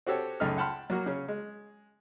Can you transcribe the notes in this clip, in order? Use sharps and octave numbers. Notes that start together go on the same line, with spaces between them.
C4 F#4 G4 A4 C#5
C#2 F#2 A3 D#4 F6
F#5 G5 A5 B5 C6 F6
F#3 A#3 F#4
C#3 C#4
G#3